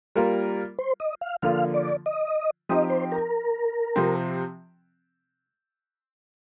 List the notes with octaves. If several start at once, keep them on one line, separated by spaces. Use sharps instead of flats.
G3 A#3 F4 A#4
C5
D#5
F5
D3 F3 A#3 F4 F5
D5
D#5
F3 C4 D#4 G4 D#5
C5
A#4
C3 F3 C4